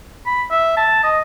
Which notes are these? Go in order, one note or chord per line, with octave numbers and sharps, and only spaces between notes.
B5
E5
A5
D#5